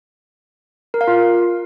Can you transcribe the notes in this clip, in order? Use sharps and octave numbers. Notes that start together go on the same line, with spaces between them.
A#4
F5
F4